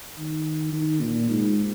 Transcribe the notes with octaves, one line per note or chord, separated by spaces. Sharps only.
D#3
D#3
A#2
G#2